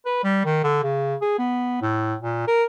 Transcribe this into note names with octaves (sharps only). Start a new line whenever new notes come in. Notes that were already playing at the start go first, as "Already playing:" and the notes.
B4
G3
D#3
D3
C#3
G#4
B3
A2
A#2
A#4